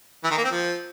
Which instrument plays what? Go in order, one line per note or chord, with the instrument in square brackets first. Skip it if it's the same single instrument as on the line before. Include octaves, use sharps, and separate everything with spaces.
[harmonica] E3
D#3
A#3
C4
F3